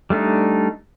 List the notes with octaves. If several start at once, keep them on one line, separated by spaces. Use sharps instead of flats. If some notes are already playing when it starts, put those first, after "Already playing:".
G3 A3 D4 D#4